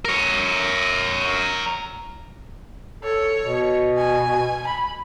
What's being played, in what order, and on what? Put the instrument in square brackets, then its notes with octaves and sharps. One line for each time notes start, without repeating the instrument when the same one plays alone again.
[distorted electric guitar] A#4 C#5
[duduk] A4 [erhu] C#5
[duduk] B2
[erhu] G#5
B5